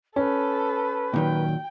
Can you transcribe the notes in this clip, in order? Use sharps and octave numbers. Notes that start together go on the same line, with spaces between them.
C#4 A4 B4
A#2 D#3 F#3 G5